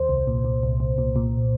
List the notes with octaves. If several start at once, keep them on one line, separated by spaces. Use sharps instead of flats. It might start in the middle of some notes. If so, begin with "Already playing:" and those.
Already playing: D#2 C5
C2
A#2
A#2
C2
C2
A#2
A#2